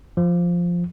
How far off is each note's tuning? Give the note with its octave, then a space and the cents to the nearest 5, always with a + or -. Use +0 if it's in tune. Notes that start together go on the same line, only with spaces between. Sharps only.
F3 +0